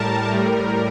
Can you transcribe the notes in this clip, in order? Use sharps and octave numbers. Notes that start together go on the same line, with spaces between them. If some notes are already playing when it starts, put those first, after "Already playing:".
Already playing: A2 G3 A#4 A5
A2 G3